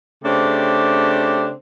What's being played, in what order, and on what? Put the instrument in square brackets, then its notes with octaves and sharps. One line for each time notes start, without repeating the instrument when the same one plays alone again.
[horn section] C#3 A3 C4 D4 G4